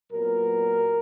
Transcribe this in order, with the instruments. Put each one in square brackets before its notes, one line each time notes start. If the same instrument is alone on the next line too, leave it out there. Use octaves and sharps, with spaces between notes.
[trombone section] A#2 F#3 B3 A#4